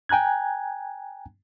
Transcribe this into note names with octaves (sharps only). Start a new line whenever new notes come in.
G5 G#5 A#5 F#6 G#6